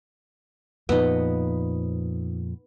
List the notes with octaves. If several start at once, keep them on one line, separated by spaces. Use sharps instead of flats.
F2 A#2 F3 B3 D#4